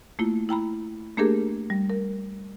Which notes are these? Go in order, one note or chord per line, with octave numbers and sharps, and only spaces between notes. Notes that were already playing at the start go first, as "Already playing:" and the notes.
A3 A#3 E4 F4
E4 G5 A#5 B5
A3 A#3 D4 G4 G#4 A#4
G3
A#4